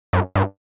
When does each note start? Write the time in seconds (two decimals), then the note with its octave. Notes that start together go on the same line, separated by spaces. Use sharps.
0.13 F#2
0.36 G2